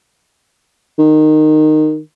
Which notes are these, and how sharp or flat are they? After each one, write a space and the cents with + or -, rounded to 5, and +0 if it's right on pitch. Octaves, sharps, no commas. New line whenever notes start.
D#3 -15